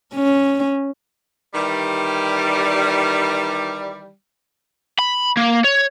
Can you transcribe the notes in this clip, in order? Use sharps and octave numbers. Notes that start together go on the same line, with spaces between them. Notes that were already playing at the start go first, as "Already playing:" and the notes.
C#4
D#3 E3 G3
B5
A#3
C#5